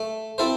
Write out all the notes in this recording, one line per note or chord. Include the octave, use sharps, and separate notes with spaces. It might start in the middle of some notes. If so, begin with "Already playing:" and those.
Already playing: A3
C4 E4 A4 C5